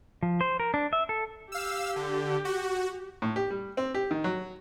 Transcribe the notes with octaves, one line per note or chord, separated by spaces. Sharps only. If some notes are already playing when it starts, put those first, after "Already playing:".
F3
C5
A#4
D4
E5
A4
G4 F5 E6
D3
F#4
A2
G4
G3
C4
G4
D#3
F#3